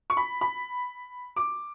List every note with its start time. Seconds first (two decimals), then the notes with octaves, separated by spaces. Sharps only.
0.10 C#6
0.17 B5
0.41 B5
1.36 D6